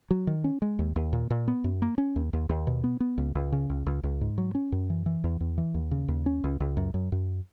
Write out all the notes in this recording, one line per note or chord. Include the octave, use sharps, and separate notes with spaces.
F#3
D#3
C#4
G#3
D#2
D#2
A#2
A#2
B3
F#2
A#3
C#4
D#2
D#2
D#2
B2
B3
B3
C#2
C#2
C#3
C#2
C#2
C#2
G#2
F#3
C#4
F#2
E3
E3
E2
E2
E3
D#2
C#3
D#2
C#4
C#2
C#2
F#2
F#2
F#2